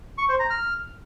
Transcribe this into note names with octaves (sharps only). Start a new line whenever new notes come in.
C#6
C5
A#5
F6